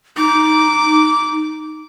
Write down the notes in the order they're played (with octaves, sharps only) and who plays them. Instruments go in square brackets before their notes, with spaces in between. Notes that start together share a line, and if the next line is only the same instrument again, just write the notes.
[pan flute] D#4 [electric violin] D6